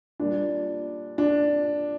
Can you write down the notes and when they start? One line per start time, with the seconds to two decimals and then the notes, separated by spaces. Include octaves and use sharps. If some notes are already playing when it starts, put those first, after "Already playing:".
0.20 A#2 G3 A#3 D4
1.18 D4